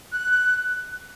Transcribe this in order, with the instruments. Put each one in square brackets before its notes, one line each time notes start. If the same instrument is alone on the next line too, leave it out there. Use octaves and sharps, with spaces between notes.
[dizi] F#6